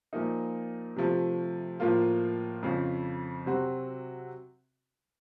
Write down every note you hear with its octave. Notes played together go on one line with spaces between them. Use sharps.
A#2 F3 A#3 D#4
C3 F3 A3
A2 F3 A#3 F4
F2 C#3 F3
C3 F#3 C4 F#4